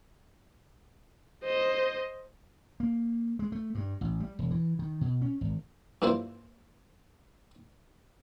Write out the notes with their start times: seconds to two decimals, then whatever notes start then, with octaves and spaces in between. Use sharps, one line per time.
1.44 C5 D#5
2.80 A#3
3.39 G#3
3.52 A3
3.75 G2
4.01 A1
4.20 G3
4.39 E1
4.51 E3
4.79 D#3
5.01 B2
5.21 C#4
5.41 G#1
6.02 G2 A#3 E4 F4 C5